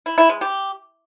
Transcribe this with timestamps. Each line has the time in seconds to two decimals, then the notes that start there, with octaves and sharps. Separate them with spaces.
0.06 E4
0.18 E4
0.29 G#3
0.41 G4